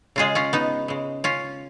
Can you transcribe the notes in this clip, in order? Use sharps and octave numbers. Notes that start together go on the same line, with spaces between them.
C#3 G#3 F4 G#4
C#4 F4
B3 D#4
C#3 G#3
C#4 F4